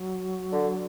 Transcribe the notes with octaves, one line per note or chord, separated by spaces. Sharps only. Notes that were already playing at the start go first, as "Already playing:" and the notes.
Already playing: F#3
D3